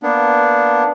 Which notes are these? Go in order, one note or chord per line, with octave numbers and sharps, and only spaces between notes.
A#3 B3 D4